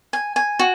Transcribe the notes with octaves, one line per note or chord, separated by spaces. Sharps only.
G#5
G#5
F#4